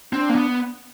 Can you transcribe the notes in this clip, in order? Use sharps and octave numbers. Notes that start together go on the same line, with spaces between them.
C4 D4
A#3
B3